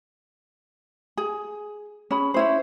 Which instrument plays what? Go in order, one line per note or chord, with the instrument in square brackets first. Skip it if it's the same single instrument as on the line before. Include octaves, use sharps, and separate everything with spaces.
[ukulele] G#4
C#4 G#4 B5
C#4 E4 C5